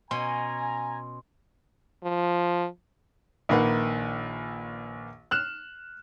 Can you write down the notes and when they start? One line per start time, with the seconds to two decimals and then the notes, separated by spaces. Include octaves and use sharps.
0.11 B2 C#4 G#5 A#5 C6
2.04 F3
3.49 A#1 D#3 A#3 B4 F#5
5.31 F6 F#6 E7